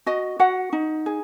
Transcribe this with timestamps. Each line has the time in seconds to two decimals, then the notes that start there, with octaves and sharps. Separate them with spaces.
0.06 F#4 D#5
0.39 F#4 F#5
0.73 D#4
1.06 G#4